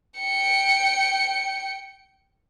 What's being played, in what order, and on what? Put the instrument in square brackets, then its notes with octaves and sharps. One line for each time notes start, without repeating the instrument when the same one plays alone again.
[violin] G5 C#7